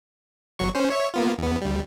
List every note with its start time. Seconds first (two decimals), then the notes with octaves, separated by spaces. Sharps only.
0.59 G1 F#3 C#6
0.75 C#4 C5
0.90 C#5 E5 C#6
1.14 A#3 B3 F4
1.38 E2 B3
1.62 D2 G3